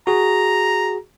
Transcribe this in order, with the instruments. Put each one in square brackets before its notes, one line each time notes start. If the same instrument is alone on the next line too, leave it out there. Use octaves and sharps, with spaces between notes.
[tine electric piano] F#4 G#4 [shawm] A#5